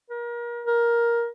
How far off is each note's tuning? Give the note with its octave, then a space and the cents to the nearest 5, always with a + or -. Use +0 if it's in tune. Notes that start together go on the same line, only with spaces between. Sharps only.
A#4 +35
A#4 +10